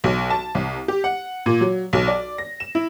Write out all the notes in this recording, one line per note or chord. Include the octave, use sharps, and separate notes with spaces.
B1
A5
C2
G4
F#5
A#2
F#3
B1
D5
A#6
E7
E4